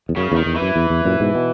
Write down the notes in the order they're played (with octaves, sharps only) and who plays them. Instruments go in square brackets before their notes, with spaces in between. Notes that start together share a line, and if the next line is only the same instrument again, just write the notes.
[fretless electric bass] E2
[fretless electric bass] F#2 [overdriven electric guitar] C#3
[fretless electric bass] E2 [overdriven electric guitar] D#3
[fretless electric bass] E2
[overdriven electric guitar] E3
[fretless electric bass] F#2
E2
E2
F#2 A#2
G#2 B2
B2